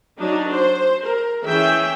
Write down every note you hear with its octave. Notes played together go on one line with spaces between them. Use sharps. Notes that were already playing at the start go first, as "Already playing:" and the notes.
F#3 D4 D#4
C5
A#4
E3 C#4 G#4 E5 G5